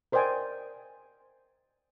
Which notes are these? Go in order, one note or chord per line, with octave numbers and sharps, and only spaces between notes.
A#4 C5 D5 D#5 G5 G#5